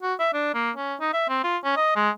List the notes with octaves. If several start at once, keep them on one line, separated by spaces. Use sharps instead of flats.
F#4
E5
D4
A#3
C#4
D#4
E5
C4
F4
C#4
D#5
G#3